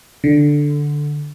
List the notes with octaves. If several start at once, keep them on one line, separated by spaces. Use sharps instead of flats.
D3